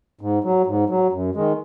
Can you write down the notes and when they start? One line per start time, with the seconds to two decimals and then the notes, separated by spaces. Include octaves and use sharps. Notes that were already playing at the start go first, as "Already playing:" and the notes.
0.21 G#2
0.44 F#3
0.67 G#2
0.90 F#3
1.12 F#2
1.35 D#3 G#3